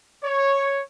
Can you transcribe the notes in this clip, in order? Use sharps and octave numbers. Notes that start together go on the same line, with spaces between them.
C#5